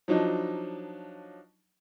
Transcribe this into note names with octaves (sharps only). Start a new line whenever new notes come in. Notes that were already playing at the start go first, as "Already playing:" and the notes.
F3 F#3 D4 D#4